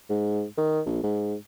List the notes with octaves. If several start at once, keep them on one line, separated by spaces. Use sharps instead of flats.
G#2
D#3
A#1
G#2